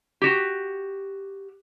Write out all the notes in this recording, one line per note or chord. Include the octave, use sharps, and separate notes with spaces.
F#4 G4